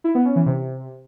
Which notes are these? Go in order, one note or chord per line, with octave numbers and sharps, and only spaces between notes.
E4
B3
C#4
E3
C3